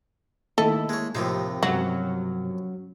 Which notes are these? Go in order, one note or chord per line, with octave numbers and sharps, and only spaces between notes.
D#3 A3 A#3 E4 A4 D#5
G#3 A#3 C#5
D#2 A2 C3 F3 D#4
G2 C3 F#3 C#4 F#4